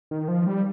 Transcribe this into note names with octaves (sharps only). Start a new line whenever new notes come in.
D#3
F3
G3